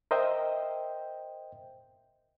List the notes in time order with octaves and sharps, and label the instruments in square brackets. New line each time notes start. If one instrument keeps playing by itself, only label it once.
[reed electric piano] A#4 C5 D#5 E5 G5